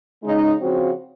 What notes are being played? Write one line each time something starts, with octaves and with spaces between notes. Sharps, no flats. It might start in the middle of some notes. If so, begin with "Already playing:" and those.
C#3 G#3 D#4
C#3 F3 C4 F#4